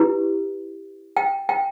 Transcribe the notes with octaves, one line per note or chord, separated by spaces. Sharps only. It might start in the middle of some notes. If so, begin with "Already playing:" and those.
Already playing: E4 G4 B4
G5
G5